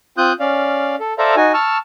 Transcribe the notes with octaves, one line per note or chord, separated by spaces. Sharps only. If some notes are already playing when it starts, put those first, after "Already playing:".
C4 F4 D#6 F#6 G6
C#4 D5 F5
A4
A4 C5 D5 E5 F5 A#5
D#4 F#4 G#5
A5 C#6 E6 F6